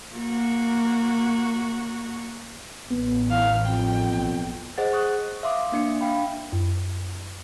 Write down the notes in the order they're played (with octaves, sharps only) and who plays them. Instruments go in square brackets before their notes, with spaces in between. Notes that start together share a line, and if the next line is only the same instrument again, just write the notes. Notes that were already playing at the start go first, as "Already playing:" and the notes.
[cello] A#3 F#4
[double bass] A1 [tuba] B3
[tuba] E3 [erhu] F5
[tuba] F2 [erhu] G5
[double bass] B1
[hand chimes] G#4 C5 D#5 F#5 A6
C#6 D#6 F#6
E5 F5 C6 D6 D#6
A#3 D4 C#7
D4 E5 F5 G5 B5
[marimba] F#2